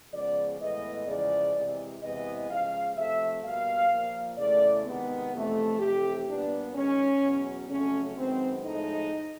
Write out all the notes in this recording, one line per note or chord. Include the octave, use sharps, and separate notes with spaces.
C#3 F3 G#3 B3 D5
A2 E3 G#3 B3 D#5
E2 C#3 F3 G#3 D5
C3 E3 G#3
E2 C3 E3 G#3 B3 D#5
C#3 F3 G#3 F5
C3 F3 A3 E5
B2 G3 A#3 F5
A#2 F3 A#3
E2 C#3 E3 A3 D5
C3 D#3 G#3 B3
F2 C3 E3 A3
F2 C3 E3 A3 G4
A#2 G3 B3 D4
G#2 D#3 G#3 C#4
E2 B2 F#3
F2 C#3 F#3 A3 C#4
F#2 D#3 G#3 B3 C4
A2 F3 G#3 D#4